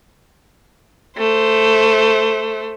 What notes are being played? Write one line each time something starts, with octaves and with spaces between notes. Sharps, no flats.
A3 C5